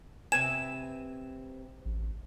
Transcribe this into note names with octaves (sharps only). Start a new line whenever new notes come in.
C3 C4 B4 G#5 E7
A1